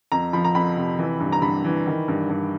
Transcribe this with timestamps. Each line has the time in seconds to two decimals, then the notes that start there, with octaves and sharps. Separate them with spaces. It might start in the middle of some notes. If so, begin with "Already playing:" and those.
0.12 F2 A#5
0.33 F3 B5
0.45 A#5
0.55 F2 B5
0.76 C3
0.99 E3
1.20 G2
1.32 A#5
1.42 G2 B5
1.65 E3
1.87 D#3
2.08 G2
2.30 G2